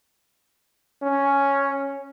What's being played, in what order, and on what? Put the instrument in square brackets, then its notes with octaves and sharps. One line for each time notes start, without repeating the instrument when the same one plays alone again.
[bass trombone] C#4